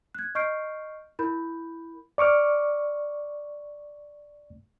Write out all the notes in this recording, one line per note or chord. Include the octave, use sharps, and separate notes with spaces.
F#6 G#6
D#5 C#6 F6 G6 C7 D7
E4 A#4 B5 G6
D5 C#6 D6 F6